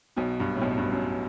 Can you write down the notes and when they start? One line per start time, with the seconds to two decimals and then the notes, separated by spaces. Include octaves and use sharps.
0.17 B1 B2
0.40 G2
0.56 A2
0.62 B1 B2
0.78 G2
0.92 F#2